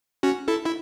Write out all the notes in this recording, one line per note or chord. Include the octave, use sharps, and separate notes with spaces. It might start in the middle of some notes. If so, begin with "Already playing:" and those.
C#4 F#4
E4 A4
E4